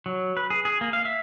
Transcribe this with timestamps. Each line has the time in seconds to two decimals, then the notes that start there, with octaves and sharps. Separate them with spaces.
0.06 F#3
0.37 B4
0.50 G#4
0.65 G#4
0.81 A#3
0.93 F5
1.05 E5